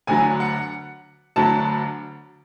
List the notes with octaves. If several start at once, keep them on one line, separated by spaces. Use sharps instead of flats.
D2 D3 F#3 G#5
F#5
D2 D3 F#3 A5